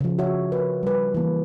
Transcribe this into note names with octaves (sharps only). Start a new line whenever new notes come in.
C#3 F3
F#4 C#5 E5
A#4 B4
G3 B4
E3 A#3